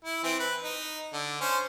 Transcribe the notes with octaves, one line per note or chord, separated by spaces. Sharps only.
E4
E3 C4
B4
D#4
D3
C#4 C5